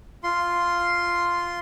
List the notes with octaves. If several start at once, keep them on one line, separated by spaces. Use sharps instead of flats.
F4 C6